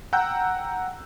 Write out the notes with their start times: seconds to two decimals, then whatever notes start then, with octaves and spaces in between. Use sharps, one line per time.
0.13 F#5 G5 A#5 E6 F#6 G6